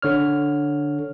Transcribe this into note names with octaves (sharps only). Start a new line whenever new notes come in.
D3 C#5 F6